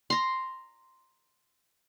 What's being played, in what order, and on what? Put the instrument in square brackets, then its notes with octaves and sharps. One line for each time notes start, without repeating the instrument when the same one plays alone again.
[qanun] A#5 C6